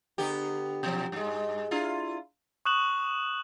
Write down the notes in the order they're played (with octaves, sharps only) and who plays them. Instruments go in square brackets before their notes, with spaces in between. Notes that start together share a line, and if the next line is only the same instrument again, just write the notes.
[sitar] D3 B3 G4
B2 F3 F#3
G2 G#3
D4 E4 F4
[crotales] C#6 D#6 F#6 E7 F#7